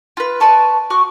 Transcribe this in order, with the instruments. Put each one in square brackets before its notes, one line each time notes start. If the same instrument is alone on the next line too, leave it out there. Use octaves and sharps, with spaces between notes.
[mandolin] F4 B4
B4 D5 A5 C#6
F#4 C#6 D6